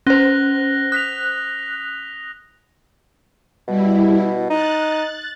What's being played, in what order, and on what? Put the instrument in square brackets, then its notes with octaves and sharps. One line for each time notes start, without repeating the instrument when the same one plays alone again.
[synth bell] C#4 C5 [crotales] F#6 A#6 G7
[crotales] D#6 B6 F7 [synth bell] F#6
[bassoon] B2 [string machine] G3 E4
[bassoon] D#4 [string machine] F#6 A6